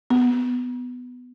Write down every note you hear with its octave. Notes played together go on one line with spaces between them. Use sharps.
B3